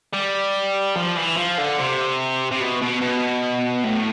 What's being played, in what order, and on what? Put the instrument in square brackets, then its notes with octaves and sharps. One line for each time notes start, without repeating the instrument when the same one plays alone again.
[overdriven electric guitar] G3
F3
E3
F3
D3
C3
C3
B2
B2
B2
A2